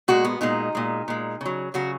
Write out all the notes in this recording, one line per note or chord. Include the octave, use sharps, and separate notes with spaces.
A#2 G#3 F#4
B3
A#2 G#3 D#4
A#2 G#3
A#2 G#3
C#3 F#3
C#3 F#3 F#4